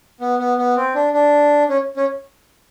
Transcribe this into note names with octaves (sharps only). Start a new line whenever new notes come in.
B3
B3
B3
C4
D4
D4
C#4
C#4